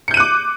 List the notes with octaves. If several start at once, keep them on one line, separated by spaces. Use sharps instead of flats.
D6 F#6 G6 C#7 D#7